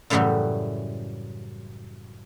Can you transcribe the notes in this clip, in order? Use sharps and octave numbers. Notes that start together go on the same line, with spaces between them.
F#2 A2 C#3 E3 F#3 G3